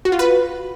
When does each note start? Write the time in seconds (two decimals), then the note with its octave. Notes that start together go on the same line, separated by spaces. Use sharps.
0.05 F#4
0.12 F4
0.19 B4